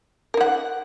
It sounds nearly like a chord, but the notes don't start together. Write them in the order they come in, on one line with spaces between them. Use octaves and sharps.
A#4 D#4 F#5